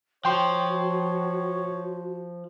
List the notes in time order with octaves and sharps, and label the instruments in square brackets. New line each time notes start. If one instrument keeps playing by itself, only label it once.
[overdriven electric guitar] F3 [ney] F#4 [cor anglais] C#5 [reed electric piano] G5 C6